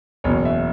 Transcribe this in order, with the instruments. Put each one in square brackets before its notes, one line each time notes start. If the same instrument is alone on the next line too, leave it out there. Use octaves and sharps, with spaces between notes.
[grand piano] F#1 E2 B2 C#5
E5